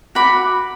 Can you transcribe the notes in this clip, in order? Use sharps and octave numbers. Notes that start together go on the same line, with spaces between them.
F#4 B5 D6